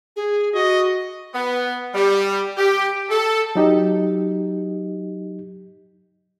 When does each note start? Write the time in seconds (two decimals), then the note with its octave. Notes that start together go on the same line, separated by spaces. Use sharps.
0.16 G#4
0.53 F#4 D#5
1.35 B3
1.95 G3
2.58 G4
3.10 A4
3.55 F#3 D#4 G4 D#5